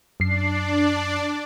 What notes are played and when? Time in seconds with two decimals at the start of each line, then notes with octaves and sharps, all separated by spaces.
0.20 F#2 D4 D5 C7